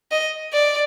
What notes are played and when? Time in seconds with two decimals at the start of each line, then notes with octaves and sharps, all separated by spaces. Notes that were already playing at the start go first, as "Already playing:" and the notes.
0.11 D#5
0.53 D5